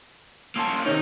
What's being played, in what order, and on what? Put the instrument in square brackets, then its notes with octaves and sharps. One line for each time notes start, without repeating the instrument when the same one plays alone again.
[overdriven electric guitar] A#3 C#4 [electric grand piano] A5 C6 E6
[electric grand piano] C3 D#3 C#5 [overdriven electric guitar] D#4